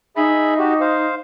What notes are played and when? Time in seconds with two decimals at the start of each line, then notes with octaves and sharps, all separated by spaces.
0.17 D#4 G#4 E5 B5
0.58 F#4 G4
0.81 C5 F5